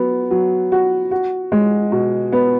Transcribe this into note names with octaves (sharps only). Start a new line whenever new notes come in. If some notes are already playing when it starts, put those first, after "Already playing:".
Already playing: F#3 B3
F#3
F#4
F#4
G#3
B2
B3